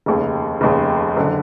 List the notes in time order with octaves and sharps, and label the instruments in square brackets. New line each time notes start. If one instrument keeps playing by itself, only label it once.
[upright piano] F1 D#2 C#3
F1 D#2 C#3
F#1 D3